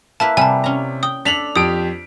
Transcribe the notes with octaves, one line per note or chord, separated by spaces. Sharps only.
A#3 E4 B4 A5
C3 G3 G#5 A5
C#4 A#5
G5 D#6
D4 A4 B6 F7 F#7
F2 G4 D#6 D7